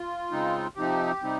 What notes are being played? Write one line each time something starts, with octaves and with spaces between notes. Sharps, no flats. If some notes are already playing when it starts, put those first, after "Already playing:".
Already playing: F4
C#3 G#3 C4 D#4
C3 F3 C4 D#4 G4
C3 G3 C4 D#4